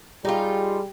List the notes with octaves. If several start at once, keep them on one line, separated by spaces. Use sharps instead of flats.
G3 D#4 F4 G4 G#4